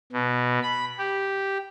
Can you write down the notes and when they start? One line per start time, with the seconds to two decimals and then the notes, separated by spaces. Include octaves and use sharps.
0.13 B2
0.63 B5
0.99 G4